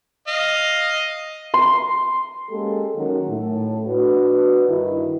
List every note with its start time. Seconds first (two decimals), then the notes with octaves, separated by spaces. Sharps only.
0.28 D#5 F5
1.54 C6
2.50 G#3 A#3 C#4 G4 A4
2.96 D#3 F#3 C#4 D#4 F#4 A#4
3.29 A2 A3
3.87 D4 F#4 B4
4.69 G2 D#3 D#4 E4